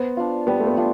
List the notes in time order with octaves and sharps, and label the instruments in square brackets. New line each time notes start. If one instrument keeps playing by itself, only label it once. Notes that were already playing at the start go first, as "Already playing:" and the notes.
Already playing: [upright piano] B3 [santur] C5
[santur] D4 F4
[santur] G3 [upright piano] B3
[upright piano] A3
B3
[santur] D4 F4